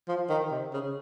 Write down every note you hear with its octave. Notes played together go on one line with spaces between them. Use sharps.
F3
D#3
C3
C#3